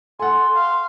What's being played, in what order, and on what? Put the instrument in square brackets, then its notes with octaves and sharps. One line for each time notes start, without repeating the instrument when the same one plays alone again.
[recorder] A4 [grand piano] F#5 G#5 [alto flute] C6
[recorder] F5